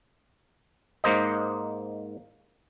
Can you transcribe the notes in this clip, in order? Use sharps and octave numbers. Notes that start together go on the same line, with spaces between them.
G#2 A#3 C5 D#5